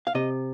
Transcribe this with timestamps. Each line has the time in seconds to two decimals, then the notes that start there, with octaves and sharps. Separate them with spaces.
0.07 F5
0.15 C3 D#5